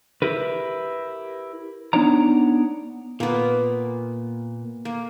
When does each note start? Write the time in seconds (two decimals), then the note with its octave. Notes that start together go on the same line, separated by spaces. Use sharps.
0.22 E4 G4 A#4 B4
1.93 B3 D4 D#4 C#5 D5 A#5
3.20 A#2 A#3 B3
4.85 A#3